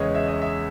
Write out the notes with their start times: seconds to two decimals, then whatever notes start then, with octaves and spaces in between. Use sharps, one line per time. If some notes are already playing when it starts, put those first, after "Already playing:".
Already playing: E2 C#3 G#3 C#5 D#5
0.14 E5
0.28 D#5
0.42 E5